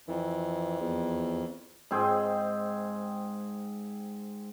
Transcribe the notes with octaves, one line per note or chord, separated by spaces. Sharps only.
F2 E3
E2
G#2 C4 G#4 G5